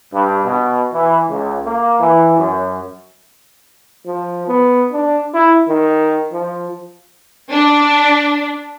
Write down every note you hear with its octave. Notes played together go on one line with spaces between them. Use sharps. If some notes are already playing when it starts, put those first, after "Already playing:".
G2
B2
E3
C#2
A#3
E3
F#2
F3
B3
D4
E4
D#3
F3
D4